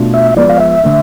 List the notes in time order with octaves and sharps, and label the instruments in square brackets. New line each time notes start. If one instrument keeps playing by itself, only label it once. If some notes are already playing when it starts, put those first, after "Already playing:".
Already playing: [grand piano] B2 A3 D4 F4
[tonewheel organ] E5
[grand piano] F3 G#3 B3 [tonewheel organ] D5
[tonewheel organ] F5
E5
[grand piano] D3 A3 D4